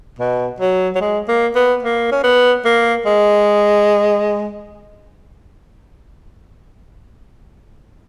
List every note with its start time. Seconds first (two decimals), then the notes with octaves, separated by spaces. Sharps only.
0.19 B2
0.60 F#3
0.95 F#3
1.01 G#3
1.28 A#3
1.55 B3
1.83 A#3
2.12 C#4
2.23 B3
2.65 A#3
3.05 G#3